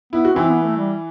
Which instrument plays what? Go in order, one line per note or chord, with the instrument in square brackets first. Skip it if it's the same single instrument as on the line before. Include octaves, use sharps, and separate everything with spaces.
[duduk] B3 [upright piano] E4
[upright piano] F#4
[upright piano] E3 E4 [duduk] C4
[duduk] B3
A3
G3